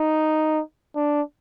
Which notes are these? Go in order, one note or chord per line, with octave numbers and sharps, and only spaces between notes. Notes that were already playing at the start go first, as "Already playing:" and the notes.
Already playing: D#4
D4